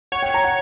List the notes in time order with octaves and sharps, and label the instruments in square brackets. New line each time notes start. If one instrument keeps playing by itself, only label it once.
[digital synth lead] C#5 [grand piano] F#5
[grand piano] G5
A#5
F#5